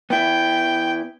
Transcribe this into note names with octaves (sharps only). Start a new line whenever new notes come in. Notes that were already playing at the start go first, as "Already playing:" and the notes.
B3 E4 G5